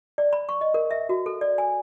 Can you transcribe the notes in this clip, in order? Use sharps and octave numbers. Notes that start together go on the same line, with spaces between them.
D5
B5
C#6
D#5
A#4
E5
F#4
A4
D5
G#5